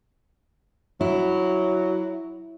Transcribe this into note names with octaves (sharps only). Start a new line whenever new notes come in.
F#3 E4